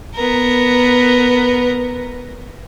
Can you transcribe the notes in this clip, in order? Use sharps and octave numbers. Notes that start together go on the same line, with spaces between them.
B3 A#4